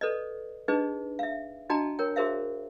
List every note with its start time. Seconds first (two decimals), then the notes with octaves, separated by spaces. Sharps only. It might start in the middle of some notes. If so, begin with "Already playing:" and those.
0.01 A4 B4 D5 D#5
0.68 D4 D#4 G#4 B4 D#5
1.19 E5 F5
1.70 D4 F#4 D#5 G5 A5 A#5
1.99 A#4 C#5 G5
2.16 F#4 G#4 A#4 C5 E5 F5